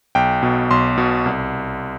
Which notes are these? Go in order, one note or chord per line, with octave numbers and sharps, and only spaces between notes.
B1 G5
B2
B1 C6
B2
C2